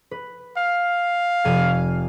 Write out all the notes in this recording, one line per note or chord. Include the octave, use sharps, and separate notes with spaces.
B4
F5
F1 G#5 D#7